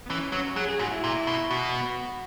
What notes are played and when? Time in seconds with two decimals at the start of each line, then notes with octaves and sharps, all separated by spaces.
0.06 B3
0.10 E3 C#4
0.32 F#3 C#4
0.56 F#3 G#4
0.68 G#4
0.79 G#2 F#4
0.91 E4
1.04 A#2
1.27 B2
1.50 B2 F#4